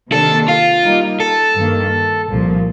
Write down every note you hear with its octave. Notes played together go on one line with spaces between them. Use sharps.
C3 D#3 A#3 D4 A4
F4
G3 A#3 D#4
A4
G2 D#3 A#3
C2 A#2 F3